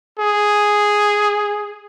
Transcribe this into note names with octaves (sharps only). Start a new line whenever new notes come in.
G#4